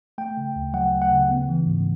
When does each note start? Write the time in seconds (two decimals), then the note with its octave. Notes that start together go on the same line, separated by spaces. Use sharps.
0.18 A3 G5
0.37 C#3
0.56 D2
0.74 F#3 F#5
0.92 A3
1.02 F#5
1.11 C#3
1.29 B3
1.49 E3
1.66 G#2